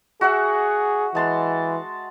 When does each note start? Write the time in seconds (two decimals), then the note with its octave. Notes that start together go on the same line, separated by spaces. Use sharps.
0.21 F#4 G#4 E5 F#5
1.15 E3 G#3 A5 C6